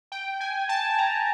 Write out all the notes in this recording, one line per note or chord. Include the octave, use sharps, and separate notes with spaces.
G5
G#5
A5
A#5